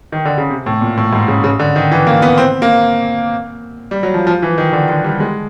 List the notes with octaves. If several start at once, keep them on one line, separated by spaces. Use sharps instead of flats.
D#3
D3
C#3
C3
A2
A#2
A2
G#2
C#3
C#3
D3
D#3
E3
A#3
B3
C4
A#3
G3
F#3
F3
F3
E3
D#3
D3
D3
G3
G#3